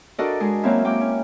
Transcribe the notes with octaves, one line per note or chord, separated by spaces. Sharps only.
D4 F#4 A4 A#4 D5 D#5
G#3 G#4
F#3 A#3 C4 C#4 E4
A#3 G5 D6
C#4